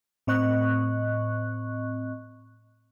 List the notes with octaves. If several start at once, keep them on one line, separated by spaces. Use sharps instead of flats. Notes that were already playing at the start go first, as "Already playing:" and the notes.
A2 C4 D#5 C#6 F#6